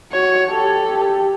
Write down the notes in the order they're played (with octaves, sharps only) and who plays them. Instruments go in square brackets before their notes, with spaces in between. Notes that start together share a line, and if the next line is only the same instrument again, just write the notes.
[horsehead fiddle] F#4 [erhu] C#5
[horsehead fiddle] G4 [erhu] A4
[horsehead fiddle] G4